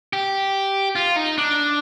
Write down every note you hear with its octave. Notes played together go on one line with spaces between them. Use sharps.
G4
F4
D#4
D4